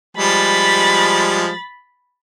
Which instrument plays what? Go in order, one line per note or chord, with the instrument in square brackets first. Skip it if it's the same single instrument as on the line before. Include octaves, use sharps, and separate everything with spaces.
[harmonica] F3 G3 G#3 [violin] B5 A6